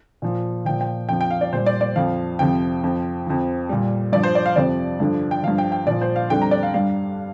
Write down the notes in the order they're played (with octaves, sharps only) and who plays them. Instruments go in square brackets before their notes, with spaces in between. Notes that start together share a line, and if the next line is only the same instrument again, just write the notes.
[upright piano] A#2 F3
A#2 F3 G5
G5
F2 F3 G5
G5
F5
D5
A#2 G3 C5
D5
D5
F2 F3 F5
F2 C3 F3 G5
F2 F3
F2 F3
A#2 G3
G2 F3 D5
C5
D5
F5
F2 C3 F3 D5
G2 D3 F3
G5
G2 F3 F5
G5
G5
A#2 F3 D5
C5
F5
F2 D3 G3 G5
A#5
D5
F5
G2 G3 F5